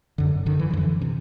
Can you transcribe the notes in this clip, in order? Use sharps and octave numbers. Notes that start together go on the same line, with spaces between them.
F#2 D3
F#2 D3 D#3
E3
F3
F#2 D3 E3
C3